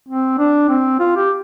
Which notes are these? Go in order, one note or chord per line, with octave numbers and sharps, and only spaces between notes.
C4
D4
C4
F4
G4